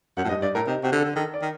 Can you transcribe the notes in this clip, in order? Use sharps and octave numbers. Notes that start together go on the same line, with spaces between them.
F#2 F#5
A2
G2 D#5
G2 D5
A2 A#4
C3 D#4
C3 F#4
D3
A4
D3
D#3 A4
D5
D#3